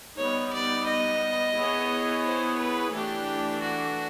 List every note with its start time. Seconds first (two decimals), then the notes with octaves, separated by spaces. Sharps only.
0.18 G3 B3 D#4 C#5
0.52 D5
0.87 D#5
1.56 B3 E4 G#4 C#5
2.25 C5
2.58 B4
2.92 E3 A3 D4 G4
3.61 F#4